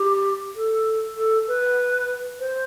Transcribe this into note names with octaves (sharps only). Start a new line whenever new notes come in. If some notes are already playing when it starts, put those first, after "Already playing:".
Already playing: G4
A4
A4
B4
C5